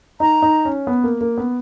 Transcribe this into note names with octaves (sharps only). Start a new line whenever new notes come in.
D#4 A#5
D#4
C#4
B3
A#3
A#3
B3